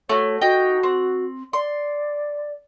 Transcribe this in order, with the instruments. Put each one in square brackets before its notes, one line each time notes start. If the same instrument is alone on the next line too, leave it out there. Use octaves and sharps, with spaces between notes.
[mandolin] A3 F#4 [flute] C#5
[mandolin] D#4 G5 [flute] F#4
[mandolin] C4
[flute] D5 [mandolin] C6